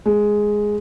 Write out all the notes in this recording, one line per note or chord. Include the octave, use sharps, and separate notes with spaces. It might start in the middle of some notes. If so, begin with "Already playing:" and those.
G#3